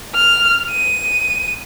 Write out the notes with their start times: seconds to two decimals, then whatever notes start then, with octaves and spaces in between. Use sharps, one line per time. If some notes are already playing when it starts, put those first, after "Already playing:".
0.15 F6
0.71 D#7